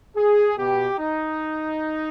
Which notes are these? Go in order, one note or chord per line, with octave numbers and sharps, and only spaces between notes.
G#4
B2 G4
D#4